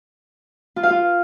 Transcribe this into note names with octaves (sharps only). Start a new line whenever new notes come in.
F4
F5
F4